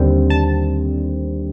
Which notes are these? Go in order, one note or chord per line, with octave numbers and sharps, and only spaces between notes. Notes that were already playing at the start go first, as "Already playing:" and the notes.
Already playing: D#2 D3 G3 C4
A5